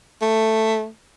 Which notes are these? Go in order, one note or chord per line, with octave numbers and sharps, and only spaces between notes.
A3